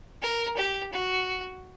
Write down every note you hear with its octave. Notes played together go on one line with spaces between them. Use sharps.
A#4
G4
F#4